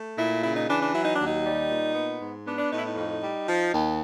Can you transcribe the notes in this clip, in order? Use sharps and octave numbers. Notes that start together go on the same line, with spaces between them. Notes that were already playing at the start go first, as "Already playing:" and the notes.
Already playing: A3
A#2 E4
C#3 E4
D#4
E3 D4
D4
F#3 E4
D#4
D#2 D4
D#4
G3
A#2
B3
G#2
B3 D4
D4
A2 D#4
E4
D#4
F2 D#4
G3
F3
D#2